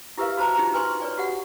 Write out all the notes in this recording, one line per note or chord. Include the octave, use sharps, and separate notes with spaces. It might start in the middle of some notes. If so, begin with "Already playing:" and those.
E4 G4 A#4 B4 E5 F5
F#4 B4 C5 A5 A#5
D#4 F4 G4 A#5
B4 G#5 C6 C#6
B4 C#5 D5 G#5
F#4 G4 F#5